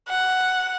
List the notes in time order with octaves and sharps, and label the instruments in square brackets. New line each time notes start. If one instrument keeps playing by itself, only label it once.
[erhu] F#5